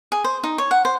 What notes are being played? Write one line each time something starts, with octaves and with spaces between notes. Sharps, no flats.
G#4
C5
D#4
C#5
F#5
C5